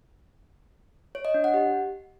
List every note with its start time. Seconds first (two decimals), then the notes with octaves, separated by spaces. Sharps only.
1.15 C#5
1.25 D#5
1.34 D4
1.44 F#5
1.54 G4